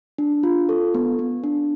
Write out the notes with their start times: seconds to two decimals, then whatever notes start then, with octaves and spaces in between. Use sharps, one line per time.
0.18 D4
0.43 F4
0.69 A4
0.95 B3
1.19 B3
1.44 D4